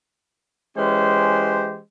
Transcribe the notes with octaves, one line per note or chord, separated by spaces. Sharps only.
E3 G#3 C#4 G4 C5